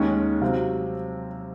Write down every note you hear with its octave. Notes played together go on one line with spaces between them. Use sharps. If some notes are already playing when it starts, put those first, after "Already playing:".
Already playing: D#2 D#3 G#3 C#4
C3 F#3 C4 F5